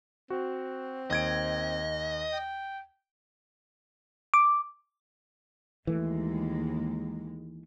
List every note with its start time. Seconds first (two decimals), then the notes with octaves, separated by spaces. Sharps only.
0.30 C4 F#4
1.11 D#2 D#5 G#6 D7
2.32 G5
4.34 D6
5.87 D#2 E3 G#3 A3